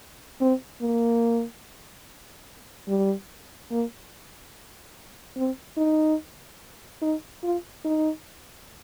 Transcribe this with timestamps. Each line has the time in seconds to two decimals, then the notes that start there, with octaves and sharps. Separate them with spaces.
0.41 C4
0.81 A#3
2.88 G3
3.71 A#3
5.37 C4
5.77 D#4
7.02 D#4
7.43 F4
7.85 D#4